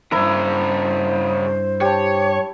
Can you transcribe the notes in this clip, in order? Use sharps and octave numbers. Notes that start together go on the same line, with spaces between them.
E2 G2 C#3 E4 A#4 C5
G4 C#5 A5